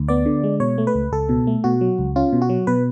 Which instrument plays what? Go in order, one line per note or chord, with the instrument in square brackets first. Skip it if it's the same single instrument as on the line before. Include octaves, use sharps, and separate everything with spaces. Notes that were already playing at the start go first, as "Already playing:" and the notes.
Already playing: [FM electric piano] D2
B3 D5
D3
G#3
B2 C#5
A3
B4
C#2
C#2 A4
B2
A3
B2 F#4
F#3
C#2
C#4 F4
B2
F#4
F#3
B2 B4